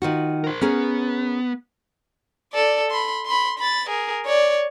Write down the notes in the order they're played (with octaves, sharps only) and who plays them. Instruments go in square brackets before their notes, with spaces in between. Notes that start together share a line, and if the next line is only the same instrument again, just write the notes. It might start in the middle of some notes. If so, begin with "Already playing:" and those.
[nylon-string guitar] D#3 F4 F#4
[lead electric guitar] A#4 C5
[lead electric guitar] B3 [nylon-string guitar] C#4 G#4 A#4
[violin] A4 D5
B5 C6
B5 C6
B5 A6
G#4 A#4
C#5 D5